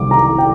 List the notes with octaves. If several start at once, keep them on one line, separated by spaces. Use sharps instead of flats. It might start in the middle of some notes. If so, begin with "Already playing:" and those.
Already playing: C2 C3 D#3 D6
A#5
G5